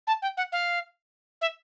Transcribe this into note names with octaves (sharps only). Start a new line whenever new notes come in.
A5
G5
F#5
F5
E5